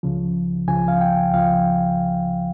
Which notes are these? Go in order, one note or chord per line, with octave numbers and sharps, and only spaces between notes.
C#2 C#3 F3
C#2 C#3 F3 G#5
F5
G5
C#2 C#3 F3 F5